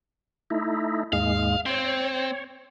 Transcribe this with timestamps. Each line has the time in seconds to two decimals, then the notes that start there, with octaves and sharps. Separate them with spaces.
0.50 A3 D#4 E4
1.13 D#2 G#2 G#3 F5
1.66 C4 C#5